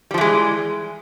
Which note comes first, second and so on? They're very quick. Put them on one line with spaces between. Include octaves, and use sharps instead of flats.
G3 F3 E3 G#3